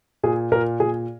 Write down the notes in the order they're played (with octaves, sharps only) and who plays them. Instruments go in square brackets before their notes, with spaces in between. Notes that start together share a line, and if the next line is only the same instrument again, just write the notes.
[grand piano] A#2 G#4
A#2 A#4
A#2 G#4